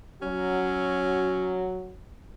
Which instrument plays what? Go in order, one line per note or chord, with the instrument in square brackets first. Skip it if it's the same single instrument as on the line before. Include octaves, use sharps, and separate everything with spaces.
[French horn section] F#3 F#4 [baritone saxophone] C#4